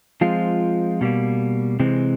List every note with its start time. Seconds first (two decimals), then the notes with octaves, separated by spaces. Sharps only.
0.21 F3 G#3 C4 F4
1.01 B2 G3 A#3
1.80 C3 E3 G#3 C4